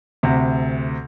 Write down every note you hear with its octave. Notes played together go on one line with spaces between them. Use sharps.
D2 C3